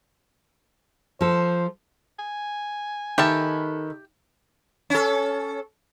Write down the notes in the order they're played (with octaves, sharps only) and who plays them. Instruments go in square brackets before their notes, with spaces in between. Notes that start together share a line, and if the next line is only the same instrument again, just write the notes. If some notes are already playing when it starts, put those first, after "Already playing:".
[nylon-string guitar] F3 A4 [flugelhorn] C5
[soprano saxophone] G#5
[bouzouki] D#3 A4 B4 [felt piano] D#4 [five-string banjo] G4 E5 A5
[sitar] C#4 A4